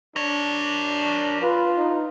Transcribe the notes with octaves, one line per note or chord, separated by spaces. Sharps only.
D4 A#4 C#5
F4 B4
D#4